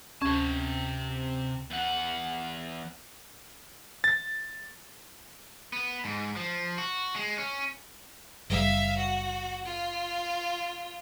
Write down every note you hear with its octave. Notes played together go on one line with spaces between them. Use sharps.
D2 C3 C#4 A5 G#6
E2 F#5
A6
B3
G#2
F3
F#4
G#3
C#4
F#1 G3 E5 F5
F#4
F4